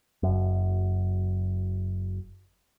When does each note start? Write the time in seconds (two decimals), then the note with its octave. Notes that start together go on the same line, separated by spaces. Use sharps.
0.23 F#1 F#2